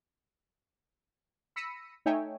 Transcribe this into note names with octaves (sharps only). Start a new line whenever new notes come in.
B5 E6 A#6 B6 C#7 D#7
A3 D#4 C#5 E5 G5 G#5